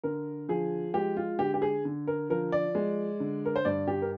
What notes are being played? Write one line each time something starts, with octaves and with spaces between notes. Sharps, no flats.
D3 A#4
F3 G#4
G#3 G4
F4
D3 G4
G4
G#4
D3
A#4
F3 A#4
D5
G#3
D3
A#4
C5
G2 D5
G4
A#4